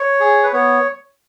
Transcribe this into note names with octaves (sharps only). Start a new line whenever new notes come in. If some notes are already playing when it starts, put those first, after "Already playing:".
Already playing: C#5
G#4
B4
B3 C#5